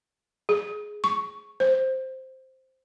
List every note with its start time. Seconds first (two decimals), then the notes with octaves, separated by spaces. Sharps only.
0.49 G#4
1.04 C#6
1.60 C5